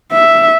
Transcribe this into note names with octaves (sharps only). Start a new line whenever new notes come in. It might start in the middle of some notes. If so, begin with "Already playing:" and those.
E5